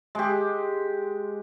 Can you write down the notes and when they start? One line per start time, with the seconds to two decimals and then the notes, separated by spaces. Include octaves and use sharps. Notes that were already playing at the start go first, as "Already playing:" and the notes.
0.15 G#3 G4